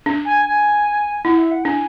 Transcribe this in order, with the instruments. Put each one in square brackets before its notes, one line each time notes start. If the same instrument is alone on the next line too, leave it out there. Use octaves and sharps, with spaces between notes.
[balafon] D4
[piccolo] G#5
G#5
[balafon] E4 [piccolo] F#5
[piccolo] E5
F#5
[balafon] D4 [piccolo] G#5